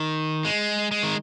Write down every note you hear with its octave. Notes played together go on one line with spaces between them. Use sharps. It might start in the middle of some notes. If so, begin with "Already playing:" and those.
Already playing: D#3
G#3
G#3
D#3